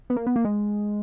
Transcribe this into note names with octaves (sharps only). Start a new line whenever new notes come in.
B3
A#3
B3
A#3
G#3